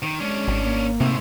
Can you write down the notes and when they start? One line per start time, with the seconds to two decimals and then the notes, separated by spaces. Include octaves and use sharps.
0.03 D#3
0.20 G#3 C#4 D4
0.48 G#1
0.63 A#3
1.00 G#2 C3 A3